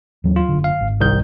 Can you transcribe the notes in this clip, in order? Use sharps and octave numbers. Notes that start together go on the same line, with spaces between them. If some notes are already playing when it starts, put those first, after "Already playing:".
D#2 E3 F#3
F4
F#1 D3
F5
G#1
C2 D#3 G6